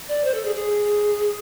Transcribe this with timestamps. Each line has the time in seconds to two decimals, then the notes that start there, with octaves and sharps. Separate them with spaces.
0.08 D5
0.24 C5
0.34 A4
0.45 G#4
0.55 G#4